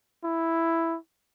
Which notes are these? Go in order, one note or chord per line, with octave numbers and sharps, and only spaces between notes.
E4